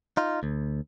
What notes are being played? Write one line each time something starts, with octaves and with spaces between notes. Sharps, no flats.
D#4 F4
D2